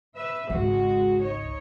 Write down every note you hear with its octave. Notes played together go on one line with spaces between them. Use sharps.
B4 E5
G#1 C#2 G#3 F#4
D#4 C#5